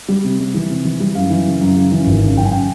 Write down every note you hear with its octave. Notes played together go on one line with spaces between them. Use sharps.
G3
C3
G3
E3
C3
E3
G3
F#2 F5
E3
C#3
F#2
C#3
E3
G#1
C#3
F#2 G5
G#5
C#3 G5